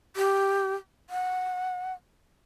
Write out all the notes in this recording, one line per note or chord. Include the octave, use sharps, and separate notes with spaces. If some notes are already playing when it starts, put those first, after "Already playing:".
G4
F#5